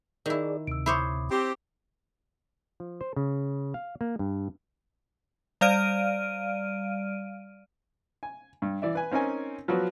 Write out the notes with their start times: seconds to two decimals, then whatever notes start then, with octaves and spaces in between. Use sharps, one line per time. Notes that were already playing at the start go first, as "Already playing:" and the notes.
0.26 D#3 E4 G#4 D5
0.67 D2 C3 E6 D7
0.86 E4 C5 C#5 B5 D6 D#6
1.31 C4 G4
2.80 F3
3.01 C5
3.16 C#3
3.74 F5
4.01 A#3
4.19 G2
5.61 G3 D5 F5 F6 D7 D#7
8.23 G#5
8.62 G2
8.82 E3 D5 E5
8.95 B4 G#5
9.11 C4 C#4 D#4 A#4 G#5
9.68 F3 F#3 B3 F#4